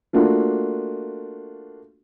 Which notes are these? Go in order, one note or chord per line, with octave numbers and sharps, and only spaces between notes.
A3 A#3 D4 F4 F#4